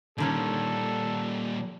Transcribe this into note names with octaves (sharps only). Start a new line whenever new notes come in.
A#2 D3 D#3 G3 C#4 A4